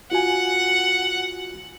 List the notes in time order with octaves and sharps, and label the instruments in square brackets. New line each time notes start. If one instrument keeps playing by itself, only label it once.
[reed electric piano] F4 F#4 G#5 [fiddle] F#5